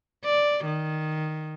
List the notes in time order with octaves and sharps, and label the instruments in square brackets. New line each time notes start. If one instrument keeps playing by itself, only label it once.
[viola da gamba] D5
D#3